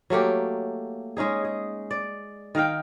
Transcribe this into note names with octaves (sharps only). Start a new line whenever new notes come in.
F#3 A3 A#3 G4
G#3 C#4 D#4 G#4
G#4
D5
D#3 A#4 F5 G5